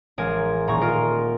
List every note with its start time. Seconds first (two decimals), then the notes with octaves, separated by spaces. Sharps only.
0.18 A1 G#3 A#4 G#5
0.67 D#1 A#5 C#6
0.81 F4 A#4 D#5